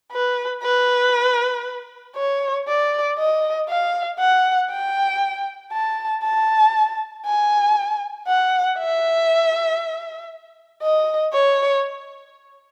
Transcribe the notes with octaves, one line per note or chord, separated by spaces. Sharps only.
B4
B4
C#5
D5
D#5
F5
F#5
G5
A5
A5
G#5
F#5
E5
D#5
C#5